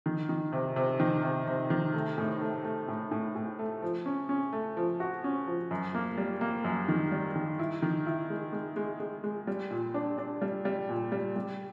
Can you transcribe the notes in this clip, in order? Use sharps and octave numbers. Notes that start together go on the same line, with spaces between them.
D#3
D#3
C3
C3
D#3
C3
C3
D#3
A3
A2
A3
A3
A2
A2
A2
A3
F3
C#4
C#4
A3
F3
F#4
C#4
F3
F#2
A#3
G3
A#3
F#2
D#3
G3
D#3
E4
D#3
E4
G#3
G#3
G#3
G#3
G#3
G3
A#2
D4
D4
G3
G3
A#2
G3
G3